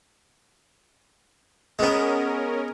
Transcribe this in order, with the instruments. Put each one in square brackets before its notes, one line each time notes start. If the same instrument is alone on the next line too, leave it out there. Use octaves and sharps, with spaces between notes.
[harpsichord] G#3 B3 [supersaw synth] C#4 A#4